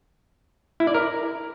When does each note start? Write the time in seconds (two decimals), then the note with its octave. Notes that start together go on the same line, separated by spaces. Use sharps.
0.80 E4
0.87 D5
0.94 A#4